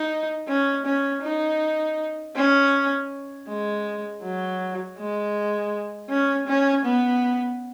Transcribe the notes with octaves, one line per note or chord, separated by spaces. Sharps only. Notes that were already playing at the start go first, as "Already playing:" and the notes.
Already playing: D#4
C#4
C#4
D#4
C#4
G#3
F#3
G#3
C#4
C#4
B3